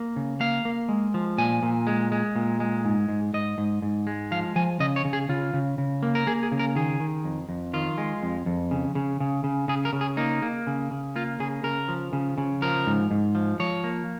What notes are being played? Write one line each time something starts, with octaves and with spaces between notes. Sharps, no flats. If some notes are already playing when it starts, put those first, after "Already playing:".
Already playing: A#3
C#3
A#3 F5
A#3
G#3
F3
A#2 G#5
A#2
G#3
G#3
A#2
G#3
G#2
G#2
G#2 D#5
G#2
G#2
G#3
F3 F5
F3 G#5
C#3 D#5
C#5
C#3
G#4
C#3 F4
C#3
C#3
A#3
A#4
A#3 G#4
G#4
C#3
A#4
D#3 G#4
D#3
F2
F2
D#3 F4
G#3
F2
F2
C#3
C#3
C#3
C#3
C#3 G#4
A#4
C#3
G#4
A#3 D#4
A#3
C#3
C#3
A#3 F4
C#3 G#4
C#3 A#4
F3
C#3
C#3
F3 A#4
G#2
G#2
F3
F3 C#5
A#3